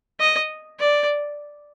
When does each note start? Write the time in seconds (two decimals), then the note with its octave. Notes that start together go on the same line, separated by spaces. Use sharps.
0.20 D#5
0.79 D5